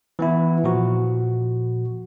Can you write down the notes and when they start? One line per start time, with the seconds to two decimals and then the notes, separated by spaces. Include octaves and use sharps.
0.19 E3 B3 E4
0.64 A#2 F3 F#4